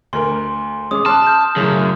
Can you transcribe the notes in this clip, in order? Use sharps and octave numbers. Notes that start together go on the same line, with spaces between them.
D2 A#4 C6
G#3 C#4 G#4 D6 D#6
A5 C6 D6 F6 F#6
F6 G6
F#2 A2 C#3